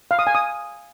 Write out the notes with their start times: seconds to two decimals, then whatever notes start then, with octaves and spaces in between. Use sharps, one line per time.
0.11 F5
0.19 D#6
0.27 G#5
0.35 D#6